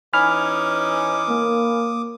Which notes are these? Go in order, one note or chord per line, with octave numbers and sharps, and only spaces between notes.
E3 C#4 D#4 G#5 B5 D6 D#6 F6
A#3